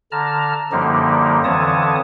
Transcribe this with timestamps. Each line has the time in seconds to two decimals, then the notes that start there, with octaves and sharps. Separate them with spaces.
0.12 D3 A5 A#5 F6
0.72 F#2 D3 F3 G3 A#3 D#4
1.44 F2 D3 E3 C#5 A5 D#6